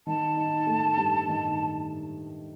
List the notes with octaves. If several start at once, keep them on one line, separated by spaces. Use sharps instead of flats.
D#3 A5
D#4
A3
G2
D#3